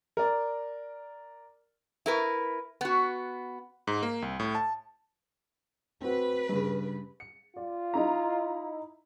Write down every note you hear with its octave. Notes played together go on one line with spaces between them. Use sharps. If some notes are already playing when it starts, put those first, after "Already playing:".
A#4 D5
E4 A#4 B4
B3 F#4
G#2
A#3
C2
A2
A5
C4 F#4 B4
G2 C#3
C#7
F4 D5
D#4 E4 A#5